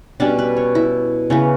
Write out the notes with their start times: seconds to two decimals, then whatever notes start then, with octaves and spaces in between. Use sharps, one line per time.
0.20 B2 G3 C#4 D4
0.39 B4
0.57 C#5
0.75 E4
1.30 C#3 E3 B3 C#4